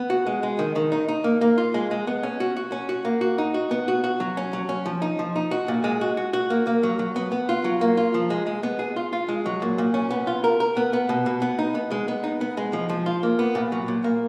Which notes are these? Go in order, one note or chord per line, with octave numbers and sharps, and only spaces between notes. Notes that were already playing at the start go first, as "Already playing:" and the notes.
Already playing: B3
F#4
G#3
G#3
D#3
D#3
D#4
D#4
A#3
A#3
F4
G#3
G#3
B3
C#4
F#4
F#4
C#4
F#4
A#3
F#4
D#4
F#4
B3
F#4
F#4
F#3
C#4
F#3
C#4
F3
D#4
F3
D#4
F#4
A#2
G#3
F#4
F#4
F#4
A#3
A#3
F#3
F#3
B3
B3
F4
F#3
A#3
F4
F3
G#3
G#3
B3
G#4
F4
F4
G#3
F#3
A#2
A#2
C#4
B3
F4
A#4
A#4
B3
B3
B2
B2
B3
D#4
B3
G#3
B3
D#4
B3
G#3
F3
F3
F4
A#3
B3
A#2
F#3
A#2
A#3